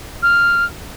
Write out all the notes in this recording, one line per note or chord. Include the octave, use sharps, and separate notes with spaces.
F6